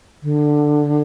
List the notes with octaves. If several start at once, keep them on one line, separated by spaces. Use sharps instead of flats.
D3